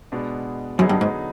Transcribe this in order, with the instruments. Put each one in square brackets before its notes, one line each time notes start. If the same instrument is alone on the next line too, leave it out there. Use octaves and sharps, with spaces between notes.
[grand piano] B2 G#3 B3 D4
[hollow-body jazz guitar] F#2 [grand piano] D3 F#3 B3 D#4 G#4
[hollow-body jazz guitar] G2
G#2